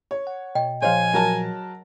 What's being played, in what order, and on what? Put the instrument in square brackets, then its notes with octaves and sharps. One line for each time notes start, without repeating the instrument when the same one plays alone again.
[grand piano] C#5
[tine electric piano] F#5
[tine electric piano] B2 [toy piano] D#5 G5
[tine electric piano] A#2 F3 [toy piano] G#4 C#5 D#5 [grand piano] C5 F5 [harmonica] G#5
[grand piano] F#3 A#4 A5